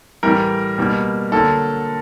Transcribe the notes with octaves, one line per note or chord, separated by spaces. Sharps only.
A2 E3 G3 A#4
B2 G3 A#3
D3 F#3 A#3 A4